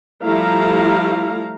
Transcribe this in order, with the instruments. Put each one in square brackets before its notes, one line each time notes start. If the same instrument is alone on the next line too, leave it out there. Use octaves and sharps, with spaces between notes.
[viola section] F3 G3 A3 E4 F5 A#5